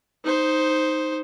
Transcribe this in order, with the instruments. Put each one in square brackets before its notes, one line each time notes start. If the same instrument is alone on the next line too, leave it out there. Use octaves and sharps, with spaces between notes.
[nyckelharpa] D#4 C5